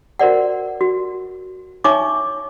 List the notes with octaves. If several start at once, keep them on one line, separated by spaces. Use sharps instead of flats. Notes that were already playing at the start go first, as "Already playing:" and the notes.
F#4 A#4 C5 D5 F#5
F#4
D#4 C#5 E5 G#5 C#6 D6